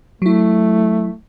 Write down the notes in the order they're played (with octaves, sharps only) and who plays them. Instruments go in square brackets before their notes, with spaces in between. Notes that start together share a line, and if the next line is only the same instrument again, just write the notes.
[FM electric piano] F#3 E4 [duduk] A3